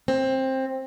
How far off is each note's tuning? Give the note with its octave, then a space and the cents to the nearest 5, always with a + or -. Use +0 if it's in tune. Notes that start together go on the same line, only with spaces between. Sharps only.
C4 +15